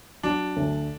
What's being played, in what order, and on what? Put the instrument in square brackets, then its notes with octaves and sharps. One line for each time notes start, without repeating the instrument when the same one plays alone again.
[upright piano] F#3 [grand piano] D4
[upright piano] D2